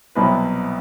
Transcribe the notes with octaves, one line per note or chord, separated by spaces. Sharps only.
C2 B2 F#3 C4 B4